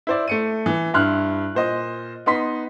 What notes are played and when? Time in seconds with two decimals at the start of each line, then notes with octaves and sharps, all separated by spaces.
0.07 E4 C5 D5
0.28 A3 C#7 D#7
0.66 E3
0.94 G2 E4 C6 F6 F#6
1.55 A#2 C5 D#5
2.26 B3 D#4 C6 B6